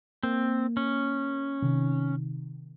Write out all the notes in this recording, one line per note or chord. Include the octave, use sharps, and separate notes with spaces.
A#3 C4
C#4
C3 D#3